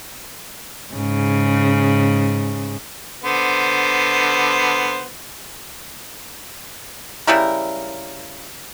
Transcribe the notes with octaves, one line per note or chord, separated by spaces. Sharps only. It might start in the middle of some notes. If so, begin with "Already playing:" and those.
G#2 C#3
D3 B3 C5
C#3 G3 E4 A#4